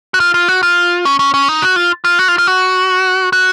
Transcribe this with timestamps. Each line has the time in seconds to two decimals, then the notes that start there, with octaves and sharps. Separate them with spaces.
0.14 F#4
0.20 F4
0.34 F4
0.48 F#4
0.63 F4
1.05 C#4
1.19 C#4
1.34 C#4
1.48 D#4
1.62 F#4
1.76 F4
2.04 F4
2.19 F#4
2.28 F4
2.38 F4
2.47 F#4
3.33 F#4